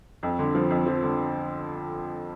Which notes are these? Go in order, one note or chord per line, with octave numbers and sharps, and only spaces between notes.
F2
D3
F3
F2
F3
D3